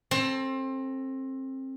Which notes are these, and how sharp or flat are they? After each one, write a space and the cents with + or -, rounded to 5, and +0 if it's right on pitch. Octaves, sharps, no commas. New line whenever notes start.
C4 +25 A4 +0